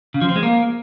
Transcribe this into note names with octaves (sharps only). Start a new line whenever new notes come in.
C#3
F3
C4
G#3
A#3